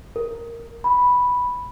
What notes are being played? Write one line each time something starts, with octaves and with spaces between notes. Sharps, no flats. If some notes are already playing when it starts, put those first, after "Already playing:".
A#4
B5